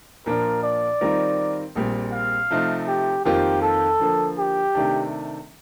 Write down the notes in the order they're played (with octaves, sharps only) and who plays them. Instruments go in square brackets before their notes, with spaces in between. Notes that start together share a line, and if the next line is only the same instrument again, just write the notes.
[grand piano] A#2 F3 A#3 D4 F4 [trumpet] A#4
[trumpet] D5
[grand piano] D#3 G3 C4 F4 A#4
A#1 A#2 G3 C4
[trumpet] F5
[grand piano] C3 F3 A3 C4 D#4
[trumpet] G4
[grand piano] F2 D#3 A#3 F4 C5 [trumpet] G4
[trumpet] A4
[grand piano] D3 F3 A#3
[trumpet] G4
[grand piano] C3 D#3 A3 D4